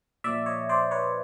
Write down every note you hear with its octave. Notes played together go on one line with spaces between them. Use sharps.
A#2 F3 D5 E5
C#5 D#5
C5 D5
B4 C#5